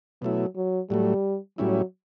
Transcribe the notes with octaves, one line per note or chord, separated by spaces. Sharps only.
B2 F#3 A3 E4
F#3
A2 F#3 G3 A3
A2 F#3 G3 C#4 E4